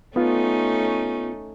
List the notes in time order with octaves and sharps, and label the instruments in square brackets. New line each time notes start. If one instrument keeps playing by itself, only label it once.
[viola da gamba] A3 C#4 D#4 [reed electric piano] B3 F4